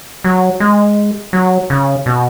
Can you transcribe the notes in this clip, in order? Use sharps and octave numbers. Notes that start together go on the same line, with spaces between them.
F#3
G#3
F#3
C#3
B2